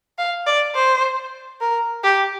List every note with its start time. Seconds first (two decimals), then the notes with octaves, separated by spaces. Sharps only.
0.18 F5
0.47 D5
0.75 C5
1.61 A#4
2.04 G4